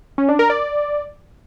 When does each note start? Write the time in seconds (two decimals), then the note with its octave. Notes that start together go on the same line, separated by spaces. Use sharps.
0.18 C#4
0.29 D4
0.39 A#4
0.50 D5